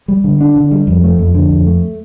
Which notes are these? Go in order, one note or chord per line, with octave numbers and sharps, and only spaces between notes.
G3
D3
D4
D3
G3
F2
A3
F2
D3
F2
A3